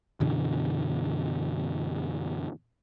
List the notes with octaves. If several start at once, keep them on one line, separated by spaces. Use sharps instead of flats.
F#2 B2 D3 E3